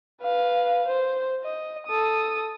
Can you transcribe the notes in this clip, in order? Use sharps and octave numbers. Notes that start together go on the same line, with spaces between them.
B4 F5
C5
D#5
A4 D#6